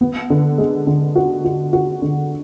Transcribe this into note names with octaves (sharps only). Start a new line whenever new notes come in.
B3
D3
G#3
D3
F#4
F#4
F#4
D3